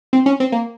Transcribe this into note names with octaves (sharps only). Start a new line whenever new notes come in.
C4
C#4
C4
A#3